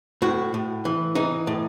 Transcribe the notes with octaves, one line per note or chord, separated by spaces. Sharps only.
A2 F#4
A2
E3
E3 D#4
A2